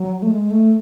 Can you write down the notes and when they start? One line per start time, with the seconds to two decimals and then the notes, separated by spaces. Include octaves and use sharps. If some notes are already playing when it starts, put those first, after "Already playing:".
Already playing: F#3
0.22 A3
0.31 G#3
0.51 A3